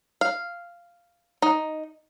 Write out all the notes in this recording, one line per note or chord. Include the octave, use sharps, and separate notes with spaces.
F5
D#4